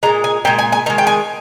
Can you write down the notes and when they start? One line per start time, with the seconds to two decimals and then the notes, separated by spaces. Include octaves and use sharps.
0.03 A#2 G#3 A#5
0.24 G#5
0.45 A#2 G#3 G5
0.59 G#5
0.72 G#5
0.86 D#3 A#5
0.90 G#3
0.98 G5
1.07 G#5